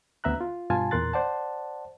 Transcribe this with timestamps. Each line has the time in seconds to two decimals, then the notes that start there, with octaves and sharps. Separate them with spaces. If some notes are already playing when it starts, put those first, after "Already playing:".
0.24 D2 B3 E5 A#5 F#6
0.41 F4
0.70 G2 B2 F4 G#5 A5
0.91 E2 A#2 A#4 C6 F#6 A6
1.13 C5 D5 F#5 A5